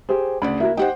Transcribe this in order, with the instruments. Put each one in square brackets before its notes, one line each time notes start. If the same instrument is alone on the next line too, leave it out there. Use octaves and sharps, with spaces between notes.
[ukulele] G4 G#4 C5
[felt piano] D2 C#3 D5 [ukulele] B5
[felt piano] A#3 [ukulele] E4 F#4 A#4
[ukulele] D#4 G4 [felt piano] C5 F#5 G5